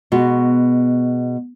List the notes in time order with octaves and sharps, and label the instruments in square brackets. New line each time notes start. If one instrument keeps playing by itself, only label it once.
[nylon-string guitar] B2 G#3 F#4